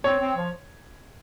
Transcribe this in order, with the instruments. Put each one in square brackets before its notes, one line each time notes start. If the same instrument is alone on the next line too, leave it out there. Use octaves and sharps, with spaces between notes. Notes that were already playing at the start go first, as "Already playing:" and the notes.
[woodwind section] C4 [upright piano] C#5
[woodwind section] C4
F3